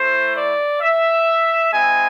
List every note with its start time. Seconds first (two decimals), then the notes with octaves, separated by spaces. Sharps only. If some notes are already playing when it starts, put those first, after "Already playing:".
Already playing: A3 E4 C5
0.36 D5
0.81 E5
1.72 G#3 C4 E4 G#5